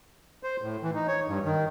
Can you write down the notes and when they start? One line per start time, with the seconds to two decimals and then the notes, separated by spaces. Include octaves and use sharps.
0.43 C5
0.62 A2
0.83 E3
0.95 D#4
1.08 C#5
1.28 G2
1.45 D#3